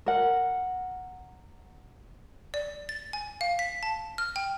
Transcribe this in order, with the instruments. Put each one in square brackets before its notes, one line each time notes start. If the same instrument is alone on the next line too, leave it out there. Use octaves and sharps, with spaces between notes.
[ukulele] A#4 F#5
[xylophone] D5
A6
G#5
F5
B6
A5
F6
G5